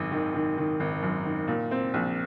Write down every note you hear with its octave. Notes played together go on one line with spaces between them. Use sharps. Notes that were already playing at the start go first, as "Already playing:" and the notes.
Already playing: G#1 F#2
D#3
D#3
D#3
G#1
F#2
D#3
A#2
C4
A#1